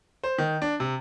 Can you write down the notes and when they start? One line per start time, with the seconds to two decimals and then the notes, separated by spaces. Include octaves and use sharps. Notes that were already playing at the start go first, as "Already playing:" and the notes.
0.24 C5
0.38 D#3
0.62 D4
0.80 C3